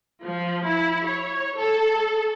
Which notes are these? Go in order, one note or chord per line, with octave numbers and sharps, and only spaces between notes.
F3
E4
C#5
A4